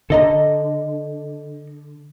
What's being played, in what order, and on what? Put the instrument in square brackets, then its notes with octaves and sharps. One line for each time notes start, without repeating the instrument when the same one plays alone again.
[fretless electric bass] D3 [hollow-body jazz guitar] A4 D#5 A#5